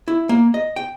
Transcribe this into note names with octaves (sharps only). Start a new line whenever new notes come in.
E4
A#3
D#5
G5